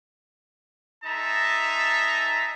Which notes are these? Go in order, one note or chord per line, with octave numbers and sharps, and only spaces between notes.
G#3 D#4 E5 A5 A#5